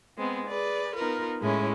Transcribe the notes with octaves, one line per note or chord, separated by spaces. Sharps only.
G#3 B3 C4
G#4 B4 D5
B3 D#4 F4 A#4 B4
A2 G#3 C#4 E4